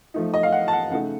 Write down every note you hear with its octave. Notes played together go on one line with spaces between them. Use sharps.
F3 A3 D#4
D#5
F5
F#5
A5
F#5
C#3 A3 D#4 F#5